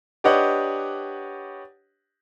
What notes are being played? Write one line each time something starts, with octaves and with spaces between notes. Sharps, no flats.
D4 G4 B4 C#5 D#5 F#5